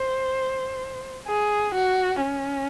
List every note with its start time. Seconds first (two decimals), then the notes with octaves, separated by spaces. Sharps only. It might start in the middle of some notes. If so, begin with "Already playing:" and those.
Already playing: C5
1.28 G#4
1.75 F#4
2.22 C#4